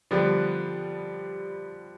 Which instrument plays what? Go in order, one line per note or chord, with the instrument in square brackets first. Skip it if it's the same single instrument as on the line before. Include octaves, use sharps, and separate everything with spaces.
[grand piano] D3 F3 B3 D4 [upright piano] G3